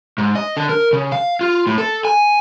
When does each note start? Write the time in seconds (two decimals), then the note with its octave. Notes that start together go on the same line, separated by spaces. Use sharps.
0.18 G#2
0.35 D#5
0.57 D3
0.69 A#4
0.93 C#3
1.12 F5
1.41 F4
1.67 A2
1.78 A4
2.05 G#5